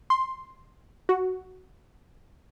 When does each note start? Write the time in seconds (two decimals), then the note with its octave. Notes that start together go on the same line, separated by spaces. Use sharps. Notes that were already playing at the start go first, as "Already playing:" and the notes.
0.10 C6
1.09 F#4